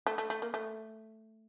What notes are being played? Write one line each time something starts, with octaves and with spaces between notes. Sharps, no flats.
A3
A3
A3
A#3
A3